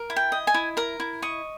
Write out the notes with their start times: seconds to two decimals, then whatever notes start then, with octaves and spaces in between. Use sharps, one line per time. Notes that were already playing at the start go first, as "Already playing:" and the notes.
Already playing: A#4
0.10 E4
0.16 G5
0.32 D#5
0.47 G#5
0.54 E4
0.77 A#4 A#5
1.00 E4
1.22 D#5 C#6